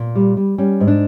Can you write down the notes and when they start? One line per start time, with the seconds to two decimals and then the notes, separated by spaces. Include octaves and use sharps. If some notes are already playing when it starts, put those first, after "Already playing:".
Already playing: A#2
0.15 G3
0.37 G3
0.58 G3 C#4
0.80 G#2
0.88 D4